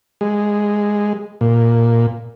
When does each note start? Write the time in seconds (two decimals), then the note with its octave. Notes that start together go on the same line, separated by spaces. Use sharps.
0.21 G#3
1.41 A#2